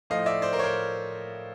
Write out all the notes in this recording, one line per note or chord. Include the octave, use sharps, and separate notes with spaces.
A2 F3 A3 D#5 F5
D5 E5
C5 D5
A#4 C5
C#5
A#4 C5